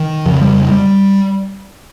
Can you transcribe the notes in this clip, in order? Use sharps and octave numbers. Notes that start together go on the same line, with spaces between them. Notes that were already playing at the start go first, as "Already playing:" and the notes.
Already playing: D#3
F2 C#3 F3
G3
G3